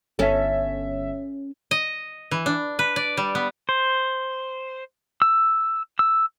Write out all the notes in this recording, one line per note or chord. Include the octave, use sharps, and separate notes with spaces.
G1 C#4 A4 E5
D#5
E3
D4
B4
D5
G3
B3
C5
E6
E6